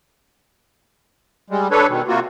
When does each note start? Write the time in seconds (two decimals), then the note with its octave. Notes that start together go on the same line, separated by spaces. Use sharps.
1.50 G3 G#3
1.71 D4 A4 B4 C#5
1.89 B2 D#3
2.08 C3 A#3 F4 F#4